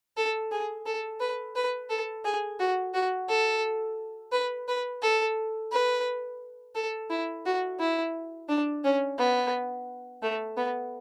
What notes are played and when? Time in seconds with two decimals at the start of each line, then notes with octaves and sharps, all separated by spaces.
0.17 A4
0.52 G#4
0.86 A4
1.20 B4
1.56 B4
1.90 A4
2.25 G#4
2.60 F#4
2.94 F#4
3.29 A4
4.32 B4
4.68 B4
5.02 A4
5.72 B4
6.75 A4
7.10 E4
7.46 F#4
7.80 E4
8.49 D4
8.84 C#4
9.18 B3
10.22 A3
10.57 B3